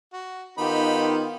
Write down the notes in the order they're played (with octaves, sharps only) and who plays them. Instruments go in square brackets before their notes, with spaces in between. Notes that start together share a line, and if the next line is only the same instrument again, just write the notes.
[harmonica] F#4
[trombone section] D#3 B3 F4 [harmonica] D#4 G4 B5